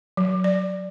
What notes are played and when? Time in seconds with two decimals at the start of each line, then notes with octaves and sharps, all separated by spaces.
0.17 F#3
0.44 D5